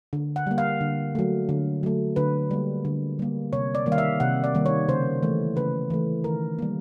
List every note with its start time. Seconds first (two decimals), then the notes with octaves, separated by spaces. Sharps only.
0.13 D3
0.36 F#5
0.47 G3 A#3
0.58 F5
0.81 D3
1.15 F#3 A3
1.49 D3
1.83 F#3 A3
2.16 D3 B4
2.51 G3 A#3
2.85 D3
3.19 G3 A#3
3.53 C3 C#5
3.75 D5
3.86 D#3 G3 A#3
3.92 F5
3.98 E5
4.20 C3 F#5
4.44 D5
4.55 D#3 G3 A#3
4.66 C#5
4.88 C#3 C5
5.23 E3 A3
5.56 C#3 B4
5.90 E3 A3
6.24 D#3 A#4
6.59 G3 A#3